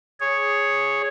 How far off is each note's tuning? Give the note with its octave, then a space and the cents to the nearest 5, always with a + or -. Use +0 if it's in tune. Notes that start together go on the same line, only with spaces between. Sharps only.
G#4 +0 C#5 +0